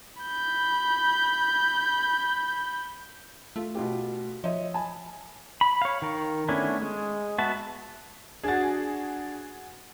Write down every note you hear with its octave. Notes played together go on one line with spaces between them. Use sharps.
B5 G6
A3 F4
B2 F4 G4
F3 C#5 D#5 E5
G#5 A5 B5
B5
C#5 F5
D#3 A#4
A3 B3 C#4 D4 E4
G#3
B3 F#4 E5 A5
D4 F#4 G#4 A6